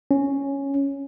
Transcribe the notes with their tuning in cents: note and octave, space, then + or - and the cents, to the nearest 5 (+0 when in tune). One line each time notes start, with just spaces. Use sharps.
C#4 +0